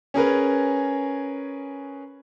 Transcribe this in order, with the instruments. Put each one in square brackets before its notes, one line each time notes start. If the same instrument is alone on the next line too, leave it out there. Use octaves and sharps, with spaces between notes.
[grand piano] C#4 G#4 A#4 B4